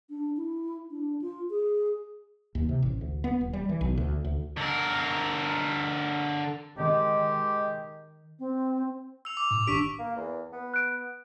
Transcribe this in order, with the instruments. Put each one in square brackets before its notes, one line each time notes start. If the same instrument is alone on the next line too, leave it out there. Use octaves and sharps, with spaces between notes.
[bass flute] D4
E4
D4
F4
G#4
[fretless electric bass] D#2
C3
A1
D2
B3
D#1
G3
E3
B1
D2
D2
[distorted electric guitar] D3 A#4
[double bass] D#3 [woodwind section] G#3 G4
[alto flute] C4
[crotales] E6 F7
D6
[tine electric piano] A2
[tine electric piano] G#1 D4 G4 [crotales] C#6 B6 D7
[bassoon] A#3
E2
B3
[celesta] F#6 D7